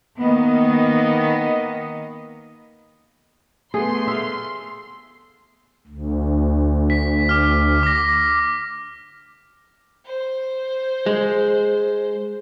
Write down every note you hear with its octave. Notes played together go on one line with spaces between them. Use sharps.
D#3 A#3 B3 D#5
A3 B3 G#4 C6
E5 F5
D2
B6
D6 F6
D6 A#6
C5
G#3